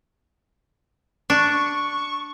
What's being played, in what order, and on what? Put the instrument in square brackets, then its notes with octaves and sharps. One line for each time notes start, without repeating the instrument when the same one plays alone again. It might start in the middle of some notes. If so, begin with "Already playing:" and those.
[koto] D4 [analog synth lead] C#6